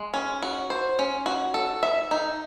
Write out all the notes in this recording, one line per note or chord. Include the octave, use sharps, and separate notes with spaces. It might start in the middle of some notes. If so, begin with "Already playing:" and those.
Already playing: G#3
C#4
F#4
C5
C#4
F#4
A4
E5
D#4